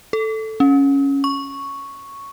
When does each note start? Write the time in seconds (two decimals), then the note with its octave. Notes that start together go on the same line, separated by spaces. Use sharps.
0.13 A4
0.60 C#4
1.24 C#6